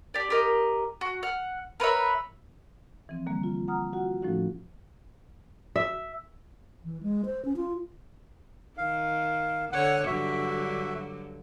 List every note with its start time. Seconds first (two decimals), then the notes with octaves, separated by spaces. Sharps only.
0.14 G4 D5
0.30 G4 A#4 D#5
1.01 F#4
1.23 F#5 F6
1.80 A#4 B4 C#5 E5
3.09 E3 F3 C4
3.26 D3 E3 G3 A#3
3.43 F4
3.68 F#5 A#5 D#6 F6
3.93 F4 F#4 F#5
4.22 A2 F3 A3 C#4 D#4 F#4
5.76 E5
6.85 E3
7.03 G#3
7.26 C5
7.45 C#4
7.56 F4
8.78 D#3 F5
9.72 D3 C#5 F#5
10.07 G2 D3 F#3 F#4 E5